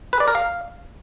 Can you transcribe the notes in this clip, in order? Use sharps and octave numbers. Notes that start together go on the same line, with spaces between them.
B4
D5
A#4
F5